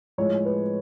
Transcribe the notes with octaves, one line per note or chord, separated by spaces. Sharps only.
A2 F3 G#3 C#5
B4